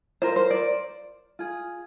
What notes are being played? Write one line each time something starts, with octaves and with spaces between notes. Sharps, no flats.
F4 A#4 C5
C5
D5
F4 G#4